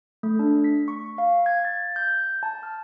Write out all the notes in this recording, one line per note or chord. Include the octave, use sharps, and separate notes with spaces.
A3
D4
B6
C#6
F5
G#6
A6
G6
A5
F6